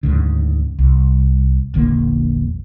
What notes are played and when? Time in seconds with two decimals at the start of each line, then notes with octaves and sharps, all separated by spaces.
0.03 D2 G#2 C#3
0.79 C2
1.74 E1 A#1 D3 A#3